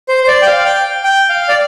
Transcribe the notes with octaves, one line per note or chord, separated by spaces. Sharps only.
C5
C5
D5
G5
F5
G5
G5
F5
D5